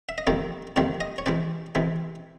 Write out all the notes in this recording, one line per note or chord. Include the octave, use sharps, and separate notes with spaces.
E5
D#5
F2 C3 D#3 G3 A#3 D5
F2 C3 D#3 G3 A#3 D5
D#5
C#5
C3 E3 G#3 D5
C3 E3 G#3